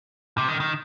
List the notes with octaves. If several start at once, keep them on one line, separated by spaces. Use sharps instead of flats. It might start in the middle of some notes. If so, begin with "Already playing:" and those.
C3
D#3
D#3